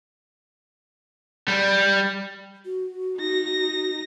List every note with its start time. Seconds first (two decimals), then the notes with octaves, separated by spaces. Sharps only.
1.48 G3
2.65 F#4
3.18 D#4 A#6